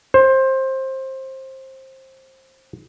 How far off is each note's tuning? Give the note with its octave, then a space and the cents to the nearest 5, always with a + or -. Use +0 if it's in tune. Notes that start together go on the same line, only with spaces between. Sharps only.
C5 +20